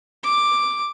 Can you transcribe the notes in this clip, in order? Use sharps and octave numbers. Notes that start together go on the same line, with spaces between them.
D6